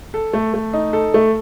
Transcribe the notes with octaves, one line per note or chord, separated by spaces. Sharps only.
A4
A3
A3
D#4
A4
A3